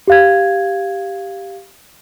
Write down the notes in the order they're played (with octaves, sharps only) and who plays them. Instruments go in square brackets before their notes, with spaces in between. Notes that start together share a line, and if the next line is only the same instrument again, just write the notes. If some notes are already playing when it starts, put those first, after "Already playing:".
[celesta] G4 F5 G#6